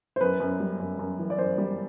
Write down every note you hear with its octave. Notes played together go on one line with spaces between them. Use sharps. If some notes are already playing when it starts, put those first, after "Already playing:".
C5
F#2 B4
F#2
G3
F#2
F#2
E3
D5
F#2 C5
G3